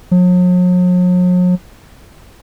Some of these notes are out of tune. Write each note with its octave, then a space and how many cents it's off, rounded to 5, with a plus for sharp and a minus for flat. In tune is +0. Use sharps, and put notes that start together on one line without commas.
F#3 -45